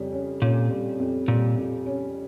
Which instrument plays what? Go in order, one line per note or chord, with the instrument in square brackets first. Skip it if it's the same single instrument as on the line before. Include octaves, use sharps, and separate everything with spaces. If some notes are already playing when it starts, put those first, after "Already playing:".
Already playing: [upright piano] F2 C#3 G3 C#4
C#4
[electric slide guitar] A#2 [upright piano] C#4
[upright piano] G3
F2
[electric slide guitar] A#2 [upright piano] G3
[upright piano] F2
C#4